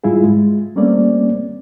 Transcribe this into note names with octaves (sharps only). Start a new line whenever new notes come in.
G#2 G3 E4 F4 G#4
G#3
G3 A3 A#3 C4 C#4 D5